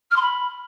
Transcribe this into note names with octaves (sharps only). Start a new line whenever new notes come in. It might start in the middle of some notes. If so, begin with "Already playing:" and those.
F6
C6
B5